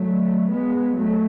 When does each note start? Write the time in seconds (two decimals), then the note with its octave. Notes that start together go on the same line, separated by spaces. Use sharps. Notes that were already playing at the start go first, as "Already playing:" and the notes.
Already playing: F#3 A3
0.49 G#3 B3
0.95 F#3 A3